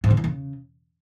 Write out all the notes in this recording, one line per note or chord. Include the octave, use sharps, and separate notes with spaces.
G#2
D3
E2
C#3